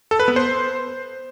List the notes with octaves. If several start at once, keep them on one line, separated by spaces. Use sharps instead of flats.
A4
B4
B3
C5